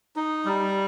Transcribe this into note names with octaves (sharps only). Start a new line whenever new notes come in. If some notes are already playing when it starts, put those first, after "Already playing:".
D#4
G3